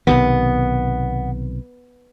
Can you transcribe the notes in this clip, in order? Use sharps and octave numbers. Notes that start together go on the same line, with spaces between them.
B1 C3 D#3 B3